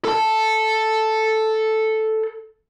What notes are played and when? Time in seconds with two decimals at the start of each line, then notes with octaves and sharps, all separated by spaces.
0.05 A4 A5